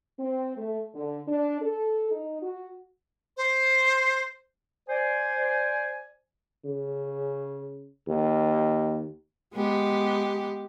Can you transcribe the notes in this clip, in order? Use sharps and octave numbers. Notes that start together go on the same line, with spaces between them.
C4
A3
D3
D4
A4
D#4
F#4
C5
C5 D5 G#5
C#3
D#2
G#3 B3 G4